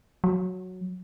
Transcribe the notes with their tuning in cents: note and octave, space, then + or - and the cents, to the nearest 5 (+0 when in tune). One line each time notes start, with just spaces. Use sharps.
F#3 -5